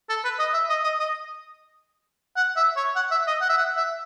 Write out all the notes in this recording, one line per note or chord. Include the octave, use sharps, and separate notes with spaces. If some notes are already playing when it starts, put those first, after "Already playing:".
A4
B4
D#5
E5
D#5
D#5
D#5
F#5
E5
C#5
F#5
E5
D#5
F#5
E5
F#5
E5